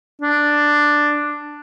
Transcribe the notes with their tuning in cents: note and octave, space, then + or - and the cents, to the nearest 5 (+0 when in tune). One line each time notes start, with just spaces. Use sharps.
D4 +5